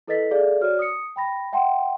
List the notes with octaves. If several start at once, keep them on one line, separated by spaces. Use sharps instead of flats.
E4 A4 B4 D#5 A6 B6
G#4 A4 D5 E5 F5
F#4 C#5 D5 F6
D#6 C#7
G5 B5 A#6
E5 F#5 G5 A5 C6